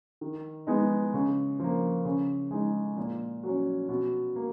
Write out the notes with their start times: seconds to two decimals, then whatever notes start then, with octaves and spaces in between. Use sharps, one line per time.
0.21 D#3
0.67 G#3 B3 D#4
1.14 C#3
1.60 F3 A#3
2.05 C#3
2.51 G#3 D#4
2.97 A#2
3.43 F#3 C#4
3.89 B2
4.36 A#3